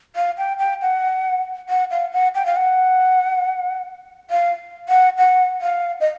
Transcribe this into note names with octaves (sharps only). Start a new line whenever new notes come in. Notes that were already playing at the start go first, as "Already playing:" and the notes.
F5
G5
G5
F#5
F#5
F5
F#5
G5
F5
F#5
F5
F#5
F#5
F5
D#5